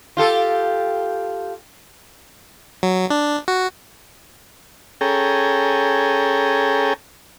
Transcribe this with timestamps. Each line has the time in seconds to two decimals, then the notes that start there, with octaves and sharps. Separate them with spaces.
0.17 F4 G4 A4
2.83 F#3
3.10 D4
3.48 F#4
5.01 C#4 G#4 A4 G5 A#5